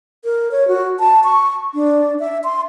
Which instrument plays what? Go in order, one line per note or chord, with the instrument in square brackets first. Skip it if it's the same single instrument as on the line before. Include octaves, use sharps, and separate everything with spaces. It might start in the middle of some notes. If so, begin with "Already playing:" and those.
[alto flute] A#4
C#5
F#4
A5
C#6
D4
E5
C6